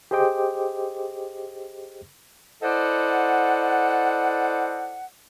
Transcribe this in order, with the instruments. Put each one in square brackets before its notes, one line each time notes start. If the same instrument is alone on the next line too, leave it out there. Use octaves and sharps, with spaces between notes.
[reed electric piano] G4 G#4 C5 D#5 G5 D6
[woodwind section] E4 A4 C5 D5 D#5 F#5